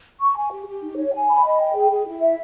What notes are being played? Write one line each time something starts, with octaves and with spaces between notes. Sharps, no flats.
C#6
G#5
G4
G4
D#4
C#5
G#5
B5
D#5
G5
G#4
G#4
E4
E5